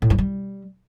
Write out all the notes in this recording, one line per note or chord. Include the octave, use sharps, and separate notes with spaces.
A2
G2
G3